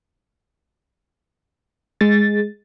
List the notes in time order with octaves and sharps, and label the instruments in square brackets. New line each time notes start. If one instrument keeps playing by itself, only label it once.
[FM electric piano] G#3 A6